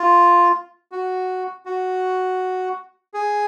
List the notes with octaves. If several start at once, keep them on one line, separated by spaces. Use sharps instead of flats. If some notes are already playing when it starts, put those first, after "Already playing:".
Already playing: F4
F#4
F#4
G#4